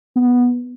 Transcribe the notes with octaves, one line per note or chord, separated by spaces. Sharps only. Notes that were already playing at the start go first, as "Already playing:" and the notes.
B3